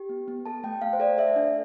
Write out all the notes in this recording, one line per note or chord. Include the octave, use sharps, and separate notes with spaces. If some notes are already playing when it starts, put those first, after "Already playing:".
Already playing: G4
B3
B3
A4 A5
A3 G5
A3 F5
C5
A4 D5
A4 E5
D4